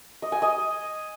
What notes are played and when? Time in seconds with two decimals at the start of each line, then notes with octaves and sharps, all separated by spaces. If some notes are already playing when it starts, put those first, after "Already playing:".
0.22 D#5
0.32 G#5
0.42 D#5